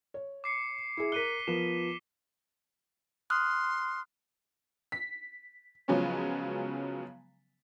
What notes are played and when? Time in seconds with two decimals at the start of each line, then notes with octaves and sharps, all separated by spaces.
0.14 C#5
0.44 D6 C7 C#7
0.97 E4 G#4
1.12 A#4 F#6 B6 D#7 G7
1.48 F3 B3 A#4 E7
3.30 C6 D#6 F6 F#6
4.92 B6
5.88 C#3 F3 F#3 G#3 B3 C#4